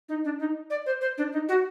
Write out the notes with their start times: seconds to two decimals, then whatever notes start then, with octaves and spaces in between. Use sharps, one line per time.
0.09 D#4
0.24 D4
0.39 D#4
0.70 D5
0.86 C5
1.01 C5
1.18 D4
1.32 D#4
1.49 F#4